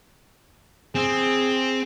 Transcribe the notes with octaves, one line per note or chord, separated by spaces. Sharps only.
C4 G#4